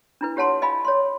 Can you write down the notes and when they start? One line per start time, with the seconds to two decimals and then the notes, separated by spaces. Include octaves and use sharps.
0.21 D4 E4 B4
0.36 F4 G4 C#5 F#5 A5 C6
0.62 D#5 F5 G#5 B5
0.85 C#5 C6